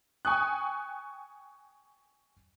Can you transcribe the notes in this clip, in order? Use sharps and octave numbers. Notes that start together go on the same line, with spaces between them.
G5 G#5 C#6 D#6 F#6